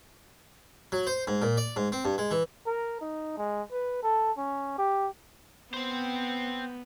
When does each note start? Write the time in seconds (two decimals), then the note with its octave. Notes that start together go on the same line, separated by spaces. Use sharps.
0.92 F#3
1.07 C5
1.27 G#2
1.42 A#2
1.57 D5
1.76 G#2
1.92 C4
2.05 G2
2.18 G#3
2.31 E3
2.66 A#4
3.01 D#4
3.37 G#3
3.71 B4
4.02 A4
4.37 C#4
4.78 G4
5.74 B3 C4 C5